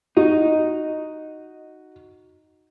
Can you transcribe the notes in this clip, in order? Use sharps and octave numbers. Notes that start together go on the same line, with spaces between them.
D#4 F#4